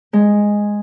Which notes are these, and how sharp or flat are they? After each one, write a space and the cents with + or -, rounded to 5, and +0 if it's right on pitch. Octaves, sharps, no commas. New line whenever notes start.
G#3 -5